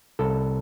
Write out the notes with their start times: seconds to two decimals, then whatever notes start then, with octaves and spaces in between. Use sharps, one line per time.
0.19 C2 A4